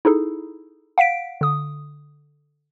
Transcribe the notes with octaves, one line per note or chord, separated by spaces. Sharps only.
D#4 E4 G#4 A4
F5 F#5 B6 D7
D3 D#6